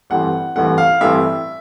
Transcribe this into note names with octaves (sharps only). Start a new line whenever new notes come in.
A1 G2 E3 A3 C4 F#5
A1 G2 E3 A3 C4 F#5
F5
A1 G2 E3 A3 C4 E5